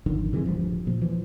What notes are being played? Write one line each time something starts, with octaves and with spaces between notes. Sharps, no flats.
G#1 F2 D3 D#3
C3 E3 F#3 G#3
D1 G2 F3
A#2 F3
E3 F3